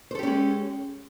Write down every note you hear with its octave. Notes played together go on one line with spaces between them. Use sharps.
G#3 C#4 G4 A4 C5